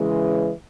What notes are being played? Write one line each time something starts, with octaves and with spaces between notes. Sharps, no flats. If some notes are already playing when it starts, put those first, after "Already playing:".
Already playing: C#3 E3 G#3